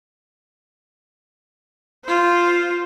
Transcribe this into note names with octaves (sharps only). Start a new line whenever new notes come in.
F4 C5